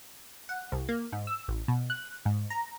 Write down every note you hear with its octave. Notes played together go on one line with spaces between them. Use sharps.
F#5
C2
A#3
G#2
E6
A1
B2
F#6
G#2
A#5